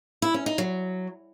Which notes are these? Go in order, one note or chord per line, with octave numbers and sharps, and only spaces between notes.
E4
C#4
D#4
F#3